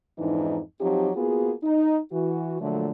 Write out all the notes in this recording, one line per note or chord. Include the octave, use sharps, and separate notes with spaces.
F2 G#2 E3 D4 D#4
F3 F#3 C4 D#4 G4
A#3 B3 F4 F#4 G#4
D#4
E3 F#4
A#2 D3 F3 F#3 A3